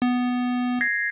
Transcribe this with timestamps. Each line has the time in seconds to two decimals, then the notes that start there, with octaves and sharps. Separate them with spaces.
0.02 B3
0.81 G#6 A#6 C7